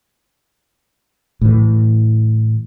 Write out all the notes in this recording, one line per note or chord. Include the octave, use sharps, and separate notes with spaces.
A2 E3